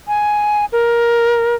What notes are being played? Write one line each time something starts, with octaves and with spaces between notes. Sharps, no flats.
G#5
A#4